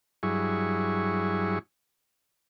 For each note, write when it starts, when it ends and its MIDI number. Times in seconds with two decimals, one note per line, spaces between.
0.23 1.59 43
0.23 1.59 54
0.23 1.59 64
0.23 1.59 68
0.23 1.59 85